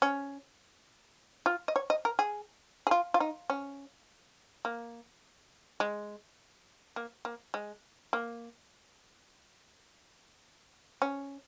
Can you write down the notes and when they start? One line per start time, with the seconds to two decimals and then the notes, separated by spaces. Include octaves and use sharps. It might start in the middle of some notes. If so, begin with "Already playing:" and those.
0.02 C#4
1.46 F4
1.68 D#5
1.76 C#5
1.90 D#5
2.05 A#4
2.19 G#4
2.87 G#4
2.91 F4
3.14 F4
3.20 D#4
3.50 C#4
4.65 A#3
5.80 G#3
6.96 A#3
7.25 A#3
7.54 G#3
8.13 A#3
11.02 C#4